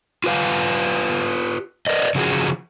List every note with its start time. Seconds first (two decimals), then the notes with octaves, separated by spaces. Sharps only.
0.24 F4 G4 B4 F5
1.87 A#4 B4 D5 D#5
2.15 C#3 F3 F#4 G#4